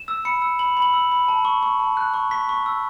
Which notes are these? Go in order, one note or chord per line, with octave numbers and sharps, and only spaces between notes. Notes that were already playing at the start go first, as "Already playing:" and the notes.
Already playing: E7
E6
B5 C#7
E6
B5 F#7
B5
F#7
E6
B5
A5
C#6
C#6
A5
F#6
C#6
C#6 B6
C#6
E6